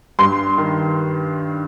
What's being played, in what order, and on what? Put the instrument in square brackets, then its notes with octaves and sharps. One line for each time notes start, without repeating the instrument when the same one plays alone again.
[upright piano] G2 C6
D#3